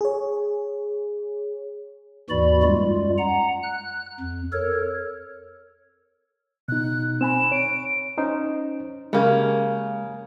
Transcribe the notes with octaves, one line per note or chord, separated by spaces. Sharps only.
G#4 C#5
D#2 G#2 E3 F#4 D5 B5
F#2 G3 G#3 F4
F#5 A#5
F#6
F2
A4 A#4 C#5
B2 D#4 F#6
C4 G#5 B5 E7
C#5 D7
C#4 D#4 C5
C#3 G#3 A#3 G4